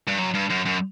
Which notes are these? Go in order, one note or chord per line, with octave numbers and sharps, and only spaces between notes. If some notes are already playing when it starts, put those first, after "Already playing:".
G2
F#2
G2
F#2
F#2